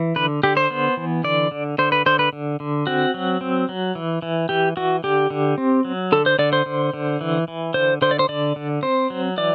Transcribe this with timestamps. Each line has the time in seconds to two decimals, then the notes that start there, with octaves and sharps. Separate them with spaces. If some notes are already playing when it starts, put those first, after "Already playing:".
Already playing: E3
0.16 D3 B4
0.43 D3 G4
0.57 C5
0.71 B3
0.97 E3
1.24 D3 D5
1.51 D3
1.78 D3 C5
1.92 B4
2.06 D3 C5
2.19 B4
2.33 D3
2.60 D3
2.87 C4 F#4
3.14 F#3
3.41 C4
3.69 F#3
3.95 E3
4.22 E3
4.49 E3 G4
4.77 E3 F#4
5.04 D3 G4
5.30 D3
5.58 C4
5.85 F#3
6.12 D3 A4
6.26 C5
6.39 D3 D5
6.53 C5
6.66 D3
6.93 D3
7.21 E3
7.48 E3
7.74 D3 C5
8.02 D3 C5
8.11 D5
8.19 C5
8.29 D3 D5
8.56 D3
8.83 C4 C5
9.10 F#3
9.37 E3 D5